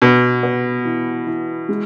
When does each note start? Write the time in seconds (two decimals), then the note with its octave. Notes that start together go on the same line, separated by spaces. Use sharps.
0.02 B2 B3
0.43 B3
0.85 E3
1.27 E3
1.69 G#3